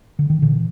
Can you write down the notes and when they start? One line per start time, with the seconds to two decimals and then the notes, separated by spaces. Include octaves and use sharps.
0.19 D3
0.30 D#3
0.42 A#2 D3 E3